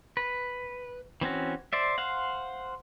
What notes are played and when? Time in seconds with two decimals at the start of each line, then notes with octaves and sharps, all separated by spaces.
0.17 B4
1.21 E3 C4 C#4 F#4
1.73 C5 D5 E5
1.98 C5 F5 F#5